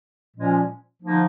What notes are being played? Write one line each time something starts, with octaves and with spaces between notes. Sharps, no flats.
A#2 F3 G#3 C#4
D3 F3 A#3 D#4